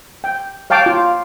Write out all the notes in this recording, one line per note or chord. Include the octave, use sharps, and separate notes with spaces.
G5
C#5 F5 G5 A5 D6
F4